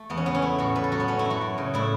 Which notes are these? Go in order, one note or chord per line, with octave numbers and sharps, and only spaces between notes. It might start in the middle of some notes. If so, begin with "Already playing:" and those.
Already playing: A3
E2 B3
C#4
C#3 B3
C#4
A3 E4
A2 F#4
A2 B4
A4
F#3 F#4
B3
A3 C#4
E4
F#2
F#4
F#2
C#3
A2 E4